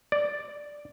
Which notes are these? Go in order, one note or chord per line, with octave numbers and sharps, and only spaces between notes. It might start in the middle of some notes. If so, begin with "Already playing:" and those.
D5